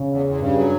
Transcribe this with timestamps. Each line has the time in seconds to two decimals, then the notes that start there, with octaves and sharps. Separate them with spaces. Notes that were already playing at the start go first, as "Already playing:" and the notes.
Already playing: C#3
0.10 E2
0.26 E2
0.41 G2 C#3
0.57 F#3